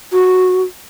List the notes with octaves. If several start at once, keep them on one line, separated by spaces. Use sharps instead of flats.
F#4